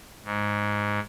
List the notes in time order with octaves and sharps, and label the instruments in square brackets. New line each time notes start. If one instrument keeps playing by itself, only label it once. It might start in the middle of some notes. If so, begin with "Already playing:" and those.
[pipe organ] G#2